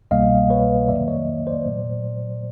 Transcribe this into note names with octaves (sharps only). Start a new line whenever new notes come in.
C2 B2 G3 A#3 D#5 F5
B4 C#5
F2 C3 D#3 F#3 A#3 D5 E5
C#5 D#5
C5 D5
A#2 F#3 A3